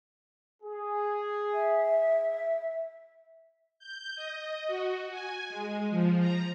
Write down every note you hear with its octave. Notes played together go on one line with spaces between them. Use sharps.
G#4
E5
G6
D#5
F#4
G#5
G#3
F3
A#5